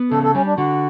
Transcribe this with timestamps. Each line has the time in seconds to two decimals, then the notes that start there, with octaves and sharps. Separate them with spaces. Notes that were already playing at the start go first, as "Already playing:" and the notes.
Already playing: B3
0.11 C#3 A4
0.23 A4
0.34 G3 C#4
0.46 D4
0.58 D3 F#4